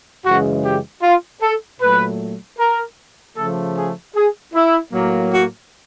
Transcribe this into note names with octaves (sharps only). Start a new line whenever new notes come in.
F#2 C#3 E3 G#3 F#4
G4
F4
A4
A#2 F#3 A3 B4
A#4
C#3 F3 A3 A4
G#4
G#4
E4
A2 F#3 A#3
F#4